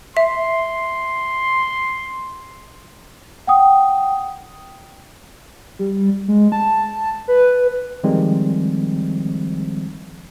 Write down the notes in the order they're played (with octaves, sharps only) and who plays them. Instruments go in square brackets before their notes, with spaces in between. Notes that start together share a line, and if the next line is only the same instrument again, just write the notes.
[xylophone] E5 [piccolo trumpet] C6
[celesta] F#5 G5 D#6
[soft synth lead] G3
G#3
A5
B4
[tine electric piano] D#3 F3 G3 G#3 C4